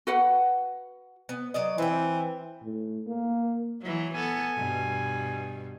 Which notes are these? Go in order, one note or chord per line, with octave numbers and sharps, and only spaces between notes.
F#4 B4 F#5
B3
F#3 D5 D#5
E3 C4 G5
A2
A#3
E3 F#3
B3 A4 G#5
G2 B2